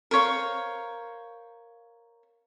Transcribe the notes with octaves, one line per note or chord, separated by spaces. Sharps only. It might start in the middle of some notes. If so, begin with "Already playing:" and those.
A#4 C5 C#5 F5